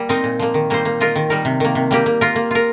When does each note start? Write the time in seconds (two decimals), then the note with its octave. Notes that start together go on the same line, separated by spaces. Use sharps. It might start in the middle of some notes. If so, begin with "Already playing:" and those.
Already playing: G3 A#3
0.09 C4 D#4 A#4 D#5
0.24 A#2
0.39 F3 A#3
0.54 D#3
0.70 G3 A#3 D#4 C5
0.85 A#3
1.00 F4 A#4 D#5
1.16 D#3
1.30 G3 D#4 A#4
1.45 C3
1.60 D#3 A#3
1.75 C3
1.91 G3 A#3 G4
2.06 A#3
2.21 F4 A#4
2.36 A#3
2.51 F4 A#4